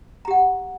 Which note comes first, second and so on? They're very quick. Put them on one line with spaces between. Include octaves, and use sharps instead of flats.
A#5 G4 F#5